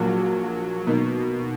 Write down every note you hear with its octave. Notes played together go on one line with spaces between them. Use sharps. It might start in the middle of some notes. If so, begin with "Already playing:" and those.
Already playing: A#1 A#2 F#3 A#3
B2 D#3 A#3 D#4